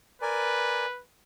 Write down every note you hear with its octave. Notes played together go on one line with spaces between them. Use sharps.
A#4 B4 D5 G#5